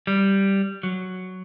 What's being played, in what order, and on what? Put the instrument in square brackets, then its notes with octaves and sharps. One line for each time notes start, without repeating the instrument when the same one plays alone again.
[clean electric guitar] G3
F#3